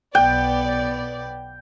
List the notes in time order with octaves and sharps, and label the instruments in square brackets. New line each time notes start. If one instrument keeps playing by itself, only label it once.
[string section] B1 B3 D5 [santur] G5